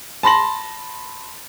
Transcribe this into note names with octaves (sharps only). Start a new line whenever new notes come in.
A5 B5 C6 A#6 F#7